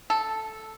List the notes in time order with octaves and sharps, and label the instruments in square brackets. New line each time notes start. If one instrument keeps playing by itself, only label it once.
[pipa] A4